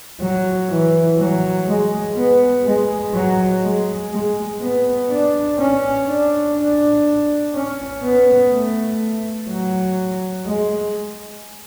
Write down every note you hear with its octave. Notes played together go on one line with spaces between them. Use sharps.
F#3
E3
F#3
G#3
B3
G#3
F#3
G#3
G#3
B3
D4
C#4
D4
D4
C#4
B3
A3
F#3
G#3